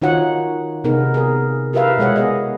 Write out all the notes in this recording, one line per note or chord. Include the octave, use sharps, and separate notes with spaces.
D#3 D#4 F4 F#4 C#5 F#5
C3 B3 D#4 G#4 A#4
G#4 A#4
E4 G4 A#4 B4 E5 F5
B2 G#3 G#4 C#5 F#5
B3 G#4 D#5